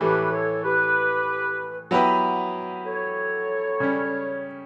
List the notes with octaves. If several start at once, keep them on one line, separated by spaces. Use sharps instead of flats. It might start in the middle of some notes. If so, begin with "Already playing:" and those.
A2 E3 A3 G4 B4
A4 C#5
G4 B4
F#3 B3 E4 G4 B4
A4 C#5
C#3 G3 C#4